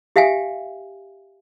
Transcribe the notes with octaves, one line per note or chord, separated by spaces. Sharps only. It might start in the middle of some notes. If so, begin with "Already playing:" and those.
G4 E5 F5 G5 G#5